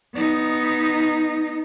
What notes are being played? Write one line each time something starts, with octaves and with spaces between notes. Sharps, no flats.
B3 D#4